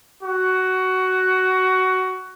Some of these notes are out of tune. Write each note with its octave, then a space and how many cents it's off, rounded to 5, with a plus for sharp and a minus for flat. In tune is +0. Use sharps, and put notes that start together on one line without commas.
F#4 +15